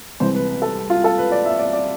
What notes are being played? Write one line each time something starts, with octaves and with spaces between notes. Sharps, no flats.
C2 C3 E3 G#3 C5
B4
B4
A4
F4
A4
B4
D5
E5
D5
D5